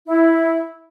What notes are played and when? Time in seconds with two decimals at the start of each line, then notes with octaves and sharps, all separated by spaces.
0.06 E4